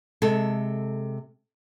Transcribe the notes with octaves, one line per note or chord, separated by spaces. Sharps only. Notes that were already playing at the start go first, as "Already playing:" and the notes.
C3 G#3 A4